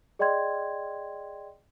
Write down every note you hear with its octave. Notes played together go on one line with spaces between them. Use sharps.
G#4 D5 D#5 G5 C6 G#6